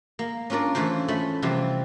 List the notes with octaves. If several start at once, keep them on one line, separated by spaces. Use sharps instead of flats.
A#3
C#4 D4 F4 A#4 D5
E3 A3 C#4 F4 C5
A3 C#4 B5
C3 E3 F3 G3 C4